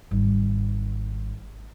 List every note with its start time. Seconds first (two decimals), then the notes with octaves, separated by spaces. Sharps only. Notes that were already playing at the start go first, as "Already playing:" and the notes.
0.11 G#1 G3